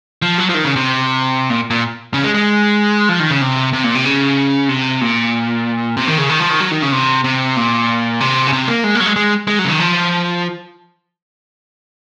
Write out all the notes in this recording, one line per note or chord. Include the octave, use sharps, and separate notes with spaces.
F3
F#3
F3
D#3
C#3
C3
A#2
A#2
C#3
G#3
G#3
F3
D#3
C#3
C3
C3
A#2
C3
C#3
C3
A#2
C3
D#3
C#3
D#3
F3
D#3
F#3
D#3
C#3
C3
C3
A#2
C3
C#3
C3
A#3
G#3
A#3
F#3
G#3
G#3
G#3
F#3
C#3
D#3
F3